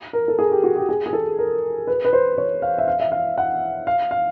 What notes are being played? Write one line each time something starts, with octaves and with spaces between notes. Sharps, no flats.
A#4
A4
G#4
G4
F#4
G4
G#4
G#4
A4
A#4
B4
B4
C5
C#5
F5
E5
F5
E5
F5
F#5
F5
F5